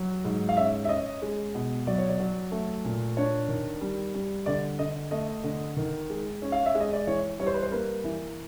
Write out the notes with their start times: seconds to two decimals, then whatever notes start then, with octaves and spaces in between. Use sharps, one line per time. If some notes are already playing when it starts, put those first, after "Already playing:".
Already playing: F#3
0.25 G#2
0.49 F5
0.56 C#4 E5
0.85 E5
0.89 C#4 D#5
1.22 G#3
1.54 B2
1.87 F#3 D5
1.98 C#5
2.09 D5
2.20 F#3
2.51 A3
2.85 A#2
3.17 D4 C#5
3.49 D#3
3.81 G3
4.14 G3
4.46 D3 D5
4.79 D3 D#5
5.11 A3 D#5
5.44 D3
5.77 D#3
6.10 G#3
6.42 C#4
6.52 F5
6.66 E5
6.75 G#3
6.80 D#5
6.93 D5
7.07 E3 C#5
7.39 G3 C#5
7.47 C5
7.54 B4
7.62 C5
7.71 A#3 B4
8.04 E3